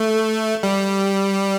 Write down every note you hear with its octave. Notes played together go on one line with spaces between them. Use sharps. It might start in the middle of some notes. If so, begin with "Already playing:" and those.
Already playing: A3
G3